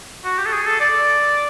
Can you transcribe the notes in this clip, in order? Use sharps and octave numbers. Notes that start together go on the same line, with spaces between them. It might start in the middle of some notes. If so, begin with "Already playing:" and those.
F#4
G4
A4
G#4
A4
D5